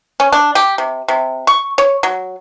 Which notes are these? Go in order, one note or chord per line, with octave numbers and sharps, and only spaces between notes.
C#4
D4
G4
C3
C3
C#6
C#5
F#3